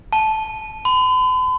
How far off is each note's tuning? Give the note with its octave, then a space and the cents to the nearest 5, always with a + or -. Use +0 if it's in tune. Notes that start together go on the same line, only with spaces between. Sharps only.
A5 -15
B5 +45